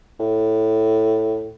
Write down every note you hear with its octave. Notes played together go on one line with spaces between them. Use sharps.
A2